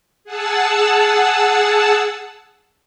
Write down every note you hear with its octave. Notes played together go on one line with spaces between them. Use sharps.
G#4 F#5 A5 E6